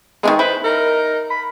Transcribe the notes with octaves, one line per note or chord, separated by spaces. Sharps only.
D#3 F#3 G#3 B3
E4 B4 C5
D#4 A#4
B5